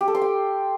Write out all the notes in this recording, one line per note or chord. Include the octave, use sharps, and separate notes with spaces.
G4
A4
C6
G5